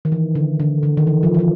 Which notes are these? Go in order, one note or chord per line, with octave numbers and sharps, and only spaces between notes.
D#3
E3
D3
D3
D3
D#3
E3
F3
E3
F3